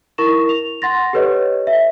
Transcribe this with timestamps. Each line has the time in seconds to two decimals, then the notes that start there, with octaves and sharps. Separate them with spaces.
0.18 E4 A#4 C#6 A#6 E7
0.49 F7
0.82 F#5 C6 A6 A#6
1.13 G4 A4 B4 C#5 D#5
1.67 E5